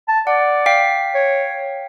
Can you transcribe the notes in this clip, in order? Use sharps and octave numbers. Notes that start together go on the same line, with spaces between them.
A5
D5 F#5
F5 G5 B6
C#5